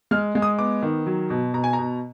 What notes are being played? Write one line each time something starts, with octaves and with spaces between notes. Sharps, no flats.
G#3 F6
G#3
D#6
B3 D6
D#3
F#3
B2
B2 A#5
G#5
A#5
B2